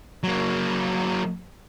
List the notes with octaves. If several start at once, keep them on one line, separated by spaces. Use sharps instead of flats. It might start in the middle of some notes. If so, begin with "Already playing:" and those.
F#3 A#3